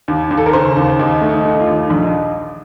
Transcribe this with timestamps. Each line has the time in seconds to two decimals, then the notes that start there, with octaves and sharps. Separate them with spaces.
0.08 D#2
0.31 D#2
0.37 A4
0.46 A#4
0.53 C#3 C5
0.77 D#2
0.99 D#2 D#4
1.21 A3
1.29 D#4
1.45 A3
1.54 D#4
1.60 F4
1.67 D#2
1.89 A#1 D#4